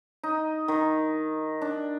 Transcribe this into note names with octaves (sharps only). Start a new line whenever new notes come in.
D#4
D#3
D4